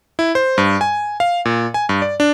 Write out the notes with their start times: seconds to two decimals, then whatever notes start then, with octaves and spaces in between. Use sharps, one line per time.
0.19 E4
0.35 C5
0.58 G2
0.81 G#5
1.20 F5
1.45 A#2
1.74 G#5
1.89 G2
2.02 D5
2.20 D4